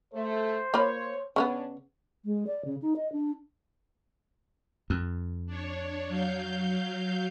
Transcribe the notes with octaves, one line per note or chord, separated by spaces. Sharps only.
A3 C5
A#3 F4 C#5 B5
C#3 G#3 B3 C#4 D4
G#3
D5
C#3
D#4
D#5
D4
F2
D4 C#5
F#3 F5 G6